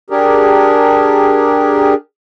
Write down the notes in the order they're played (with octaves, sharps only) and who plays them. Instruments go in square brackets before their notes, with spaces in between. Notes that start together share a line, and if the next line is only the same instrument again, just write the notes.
[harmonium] D4 G4 G#4 A#4